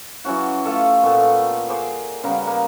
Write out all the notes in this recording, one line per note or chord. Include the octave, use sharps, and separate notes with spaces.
E3 F#3 C#4 F#4
A3 F4 G4 A4
A#2 A3 B3
G#4 C5 F#5 D6
C#3 G3 B3 A#4
A#3